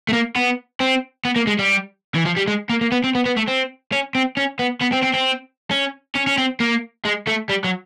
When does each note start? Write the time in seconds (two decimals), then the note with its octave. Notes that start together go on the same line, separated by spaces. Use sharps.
0.09 A3
0.13 A#3
0.36 B3
0.81 C4
1.25 B3
1.36 A#3
1.47 G#3
1.59 G3
2.15 E3
2.25 F3
2.36 G3
2.48 G#3
2.70 A#3
2.81 A#3
2.92 B3
3.04 C4
3.15 B3
3.26 B3
3.37 A3
3.48 C4
3.92 C#4
4.15 C4
4.37 C#4
4.59 B3
4.81 B3
4.93 C4
5.04 C4
5.15 C4
5.71 C#4
6.15 C#4
6.27 C#4
6.38 C4
6.60 A#3
7.05 G#3
7.27 A3
7.49 G3
7.64 F#3